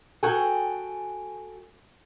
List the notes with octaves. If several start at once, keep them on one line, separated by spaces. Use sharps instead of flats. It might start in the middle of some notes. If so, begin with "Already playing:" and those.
F#4 G#4 A4 G5 G#5